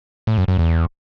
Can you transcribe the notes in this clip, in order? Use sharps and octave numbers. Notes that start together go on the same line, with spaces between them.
A2
F#2
F#2
E2